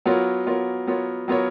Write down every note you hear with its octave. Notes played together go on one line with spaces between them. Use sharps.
F#3 B3 F4 A#4 C#5
F#3 B3 F4 A#4 C#5
F#3 B3 F4 A#4 C#5
F#3 B3 F4 A#4 C#5